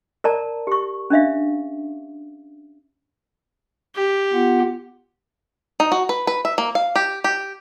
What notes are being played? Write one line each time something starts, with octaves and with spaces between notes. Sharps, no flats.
A#4 D5 A5 A#5
G4 C#6
C#4 D4 E5 F5
G4
B3 F4 F#5
D#4
F#4
B4
B4
E5
A#3
F5
G4
G4